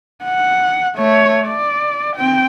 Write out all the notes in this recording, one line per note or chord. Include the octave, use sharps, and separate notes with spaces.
F#5
A3 C#5
D5
C4 G5